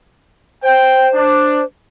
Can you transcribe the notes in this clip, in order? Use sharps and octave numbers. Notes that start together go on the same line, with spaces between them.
C5 G5
D4